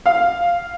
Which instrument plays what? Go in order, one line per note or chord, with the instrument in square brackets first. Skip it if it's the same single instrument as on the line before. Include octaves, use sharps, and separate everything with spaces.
[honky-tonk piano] F5